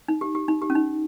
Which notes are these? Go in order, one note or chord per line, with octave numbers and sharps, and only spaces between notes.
D#4
G4
G4
D#4
G4
C#4
D#4